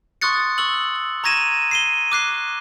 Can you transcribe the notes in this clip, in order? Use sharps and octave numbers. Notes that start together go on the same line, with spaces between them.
C6 C#6 D#6 F#6 A6 C#7
C#6 E6 F#7
A#5 C#6 G#6 A#6 D#7 E7
C7 D#7 G7
D6 F#6 C7